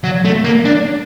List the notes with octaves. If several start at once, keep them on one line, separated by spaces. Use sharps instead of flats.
F#3
A3
A#3
D4